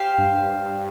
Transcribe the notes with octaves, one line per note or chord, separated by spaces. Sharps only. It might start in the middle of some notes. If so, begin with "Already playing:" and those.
Already playing: G4 C5 F5
G2